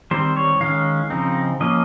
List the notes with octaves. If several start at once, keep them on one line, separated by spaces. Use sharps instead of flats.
D#3 G3 C4 C5
C#5
D#3 G#3 C#4 F5
C#3 F3 C4 D#4
F3 A#3 C#4 D#5